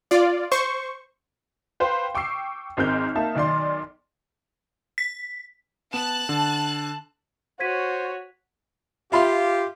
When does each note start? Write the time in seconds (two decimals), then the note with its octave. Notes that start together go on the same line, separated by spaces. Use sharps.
0.11 F4 D5
0.52 C5 C#6
1.80 B4 C5 F5 G5 C6
2.15 G5 C#6 D6 E6 C7
2.77 G#1 G#2 C4 A#4 F6 G6
3.15 A#3 D#4 E5 A5
3.35 B1 D#3 D5 C6
4.98 B6
5.93 B3 A5 F#6 E7
6.29 D3
7.60 F#4 C5 C#5 G#6 B6 D#7
9.12 F4 G4 E5 B5 C6